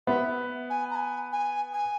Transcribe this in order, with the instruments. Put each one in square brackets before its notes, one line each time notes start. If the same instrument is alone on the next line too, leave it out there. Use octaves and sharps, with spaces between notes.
[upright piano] B3 [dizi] E5
[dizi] G#5
A#5
G#5
G#5
G#5